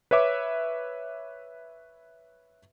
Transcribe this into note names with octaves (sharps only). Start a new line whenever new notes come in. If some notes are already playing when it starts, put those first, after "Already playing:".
B4 C#5 E5 D6